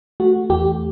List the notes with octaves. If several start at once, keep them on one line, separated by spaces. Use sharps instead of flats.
A3 F#4
E2 G4